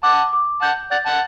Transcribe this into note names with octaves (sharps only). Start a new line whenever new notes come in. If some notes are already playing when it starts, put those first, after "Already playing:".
F#5 A5 D6
D6
F#5 A5 G6
D5 F#5 A6
F#5 A5